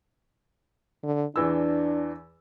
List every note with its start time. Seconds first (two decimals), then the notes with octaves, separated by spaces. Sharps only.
1.03 D3
1.36 E2 E3 D4 E6